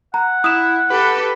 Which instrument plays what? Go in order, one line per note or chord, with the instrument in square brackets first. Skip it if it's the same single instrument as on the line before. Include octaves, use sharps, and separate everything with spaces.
[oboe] F#5 [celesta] A#5
[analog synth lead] E4 [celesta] D#6 E7
[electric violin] G4 A4 [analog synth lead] B4